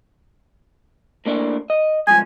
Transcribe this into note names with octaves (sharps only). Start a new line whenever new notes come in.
A2 A#3 D4
D#5
C2 G#2 F3 G#5